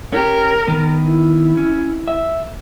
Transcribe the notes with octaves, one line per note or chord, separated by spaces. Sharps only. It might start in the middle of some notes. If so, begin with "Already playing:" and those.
C#4 G4 A#4
D#3 B3
E4
C#4
E5